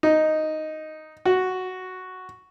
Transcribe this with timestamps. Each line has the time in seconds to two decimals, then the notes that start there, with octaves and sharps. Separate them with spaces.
0.03 D#4
1.25 F#4